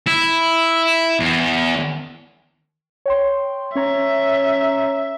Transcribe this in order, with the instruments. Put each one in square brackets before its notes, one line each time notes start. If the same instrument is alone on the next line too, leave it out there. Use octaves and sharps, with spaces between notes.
[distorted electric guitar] E4
E2
[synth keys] C#5 G5 C6
[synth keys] C#4 C#5 A#5 [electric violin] E5